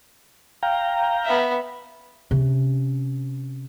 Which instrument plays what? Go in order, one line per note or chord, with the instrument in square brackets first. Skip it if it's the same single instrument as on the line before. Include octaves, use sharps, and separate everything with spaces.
[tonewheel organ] F5 G5 A#5
[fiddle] B3 E5
[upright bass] C3 C#4